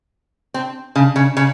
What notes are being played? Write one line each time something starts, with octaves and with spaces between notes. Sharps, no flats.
C4
C#3
C#3
C#3